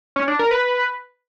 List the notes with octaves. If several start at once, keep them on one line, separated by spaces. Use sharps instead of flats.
C#4
D4
A#4
B4